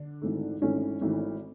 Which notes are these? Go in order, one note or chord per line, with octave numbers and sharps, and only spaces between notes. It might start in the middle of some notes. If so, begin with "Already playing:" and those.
Already playing: D3 D4
G#1 G#2 E3 A3
G#1 G#2 E3 A3 C#4
G#1 G#2 E3 A3